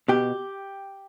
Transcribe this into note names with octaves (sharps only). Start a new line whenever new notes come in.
B2 G4